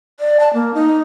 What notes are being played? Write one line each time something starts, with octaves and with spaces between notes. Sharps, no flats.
D5
A5
A#3
D#4